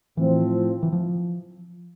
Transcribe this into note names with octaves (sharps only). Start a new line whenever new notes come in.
A2 E3 F3 C4
E3
F3